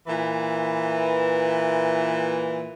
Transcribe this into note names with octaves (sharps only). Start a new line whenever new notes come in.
A#2 E3